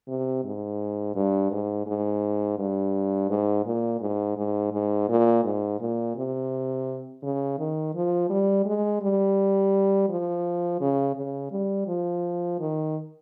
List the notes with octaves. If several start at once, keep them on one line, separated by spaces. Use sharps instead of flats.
C3
G#2
G2
G#2
G#2
G2
G#2
A#2
G#2
G#2
G#2
A#2
G#2
A#2
C3
C#3
D#3
F3
G3
G#3
G3
F3
C#3
C#3
G3
F3
D#3